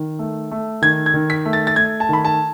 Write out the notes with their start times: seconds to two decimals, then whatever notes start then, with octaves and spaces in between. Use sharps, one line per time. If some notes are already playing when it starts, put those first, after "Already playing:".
Already playing: D#3
0.19 A3
0.51 A3
0.82 D#3 G#6
1.06 G#6
1.14 D#3
1.30 B6
1.45 A3
1.53 A6
1.67 A6
1.76 A3 G#6
2.00 A5
2.09 D#3 B5
2.25 A5